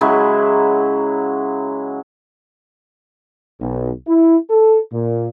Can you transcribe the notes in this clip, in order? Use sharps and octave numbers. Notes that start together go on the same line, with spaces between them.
C#3 F#3 G#3 E4
B1
E4
A4
A#2